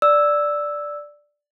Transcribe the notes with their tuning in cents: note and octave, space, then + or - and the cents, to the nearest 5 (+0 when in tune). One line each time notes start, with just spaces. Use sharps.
D5 +0 E6 +0